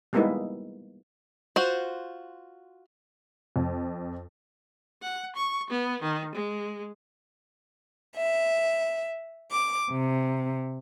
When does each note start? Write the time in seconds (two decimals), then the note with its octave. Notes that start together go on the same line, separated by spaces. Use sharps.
0.13 G3 G#3 A#3 B3 D#4 E4
1.56 F4 F#4 C5
3.56 F2
5.02 F#5
5.36 C#6
5.70 B3
6.02 D#3
6.35 G#3
8.17 E5
9.52 D6
9.91 C3